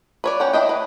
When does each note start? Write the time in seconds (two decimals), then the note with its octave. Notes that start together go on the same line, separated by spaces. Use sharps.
0.24 B4 C#5 D5
0.40 C#4 F#5 G5
0.53 D4 E4 D#5 G5
0.69 B4